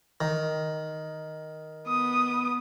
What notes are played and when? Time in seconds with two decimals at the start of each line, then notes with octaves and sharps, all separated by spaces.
0.21 D#3
1.88 B3 D#6